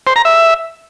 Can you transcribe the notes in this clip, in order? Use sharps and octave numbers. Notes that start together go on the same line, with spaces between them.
C5
A#5
E5